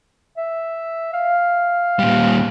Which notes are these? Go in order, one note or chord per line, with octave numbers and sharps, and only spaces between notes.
E5
F5
A#2 G3